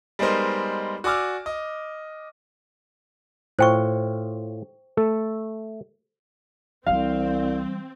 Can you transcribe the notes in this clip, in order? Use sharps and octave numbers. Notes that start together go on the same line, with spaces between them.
G3 G#3 B3 D#4 A#4 C5
F#4 D5 G#5 D6 E6 F6
D#5
A2 F4 C5 G5 C#6
A3 A4
C2 E3 G3 C4 F5